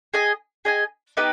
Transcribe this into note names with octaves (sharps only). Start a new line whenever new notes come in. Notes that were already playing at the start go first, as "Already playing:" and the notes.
G#4 D#5 G#5
G#4 D#5 G#5
B3 D#4 G4 B4